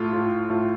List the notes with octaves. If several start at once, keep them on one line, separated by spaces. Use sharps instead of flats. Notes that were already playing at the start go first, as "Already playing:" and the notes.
Already playing: A2 A3 F4
A2 A3 F4
A2 A3 F4